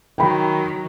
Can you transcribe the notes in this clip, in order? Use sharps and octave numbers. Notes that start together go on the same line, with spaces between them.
D#3 F#3 G5 B5